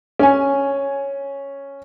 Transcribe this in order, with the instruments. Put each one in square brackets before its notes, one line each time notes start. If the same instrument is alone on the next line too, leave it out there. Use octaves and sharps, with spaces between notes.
[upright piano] C#4 G#5